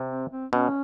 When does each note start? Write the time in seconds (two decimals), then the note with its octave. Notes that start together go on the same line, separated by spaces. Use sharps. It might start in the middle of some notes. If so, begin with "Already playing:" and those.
Already playing: C3
0.10 C4
0.30 C4
0.52 B2 C#4